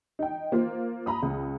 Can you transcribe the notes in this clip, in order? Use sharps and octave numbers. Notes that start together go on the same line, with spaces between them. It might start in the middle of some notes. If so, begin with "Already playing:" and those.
D#4 G5
A#3 F4 C5
A#5 B5 D#6
C#2